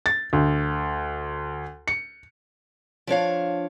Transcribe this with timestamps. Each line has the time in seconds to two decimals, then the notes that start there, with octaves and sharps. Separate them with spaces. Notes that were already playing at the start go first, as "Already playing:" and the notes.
0.06 A6
0.33 D2
1.88 C#7
3.07 F3 D4 C#5 F5